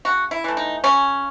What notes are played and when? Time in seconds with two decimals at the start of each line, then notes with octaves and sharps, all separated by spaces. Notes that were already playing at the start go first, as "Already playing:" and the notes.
0.05 C#3 F#4
0.31 E4
0.44 E3 A3
0.57 D#4
0.84 C#3 C#4